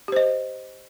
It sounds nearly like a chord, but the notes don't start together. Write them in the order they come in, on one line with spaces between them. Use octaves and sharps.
G4 C5 D#5